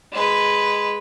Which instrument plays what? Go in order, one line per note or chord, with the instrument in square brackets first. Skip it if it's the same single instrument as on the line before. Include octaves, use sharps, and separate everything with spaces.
[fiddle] G#3 B4